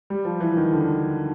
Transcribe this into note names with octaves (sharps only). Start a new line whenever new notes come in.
G3
F3
E3
D#3
D3